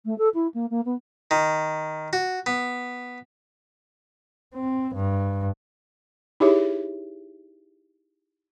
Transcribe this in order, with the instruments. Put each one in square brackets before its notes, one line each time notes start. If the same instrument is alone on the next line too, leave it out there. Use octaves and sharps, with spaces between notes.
[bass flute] A3
A4
E4
A#3
A#3
B3
[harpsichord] D#3
F#4
B3
[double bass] C4
G2
[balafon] D#4 E4 G4 G#4 C#5 E5